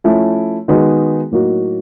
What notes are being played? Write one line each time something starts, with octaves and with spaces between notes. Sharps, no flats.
F3 A3 C#4 E4
D#3 G#3 B3 D#4 F#4
A2 F#3 A#3 D#4 F#4